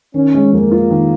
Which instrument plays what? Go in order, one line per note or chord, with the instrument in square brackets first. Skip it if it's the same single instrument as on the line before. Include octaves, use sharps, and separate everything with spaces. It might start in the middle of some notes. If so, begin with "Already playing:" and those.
[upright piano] D#3 [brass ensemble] C#4
[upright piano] G#3
[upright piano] F2 [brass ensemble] A#3
[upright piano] F4
D#3